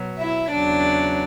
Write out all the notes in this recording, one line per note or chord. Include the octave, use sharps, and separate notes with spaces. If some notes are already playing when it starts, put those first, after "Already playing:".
Already playing: B2 F#3
E4 E5
E2 C#3 F#3 D4 D5